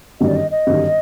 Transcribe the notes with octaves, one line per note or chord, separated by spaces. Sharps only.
G1 F#2 D#3 G3 D#5
D5
D#5
D#5
G1 F#2 D#3 G3